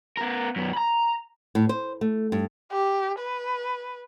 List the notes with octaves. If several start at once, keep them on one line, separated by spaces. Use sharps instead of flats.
B3 A#4
F#2 B3
A#5 B5
A2
C5
A3
G2
G4
B4